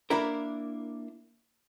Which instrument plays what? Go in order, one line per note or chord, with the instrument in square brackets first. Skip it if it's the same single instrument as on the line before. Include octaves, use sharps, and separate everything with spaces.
[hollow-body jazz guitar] A#3 D4 E4 A#4